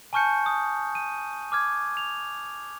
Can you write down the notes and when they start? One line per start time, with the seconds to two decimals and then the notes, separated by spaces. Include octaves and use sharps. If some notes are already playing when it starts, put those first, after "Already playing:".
0.13 G#5 A5 C#6 F6 G6 C#7
0.46 D#6
0.95 D#7
1.52 D6 F6 G#6
1.97 F7